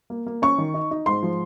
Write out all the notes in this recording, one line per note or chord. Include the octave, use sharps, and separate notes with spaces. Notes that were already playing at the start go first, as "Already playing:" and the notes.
A#3
A#3
C#4 C#6
D#3
D#4
D#4
G#2 C6
F3